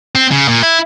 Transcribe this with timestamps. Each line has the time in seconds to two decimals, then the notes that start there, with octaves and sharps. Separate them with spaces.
0.15 C4
0.31 C#3
0.48 A#2
0.63 E4